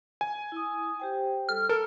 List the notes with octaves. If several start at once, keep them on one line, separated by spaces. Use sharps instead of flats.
G#5
E4 D#6
G4 C5 G5
G3 A4 F6
A4 A#4 A#5